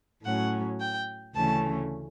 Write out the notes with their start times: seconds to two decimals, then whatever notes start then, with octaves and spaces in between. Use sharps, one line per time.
0.24 A2 F#3 C#4 F#5
0.80 G5
1.35 D2 C#3 E3 A3 C#4 A5